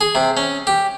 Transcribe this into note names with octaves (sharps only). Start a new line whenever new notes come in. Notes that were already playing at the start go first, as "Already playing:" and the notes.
G#4
C3
C#4
G4